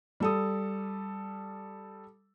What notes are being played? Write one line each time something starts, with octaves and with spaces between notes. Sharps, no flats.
G3 A4 D#6